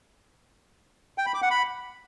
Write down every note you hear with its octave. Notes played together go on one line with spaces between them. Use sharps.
G5
B5
D6
F#5
B5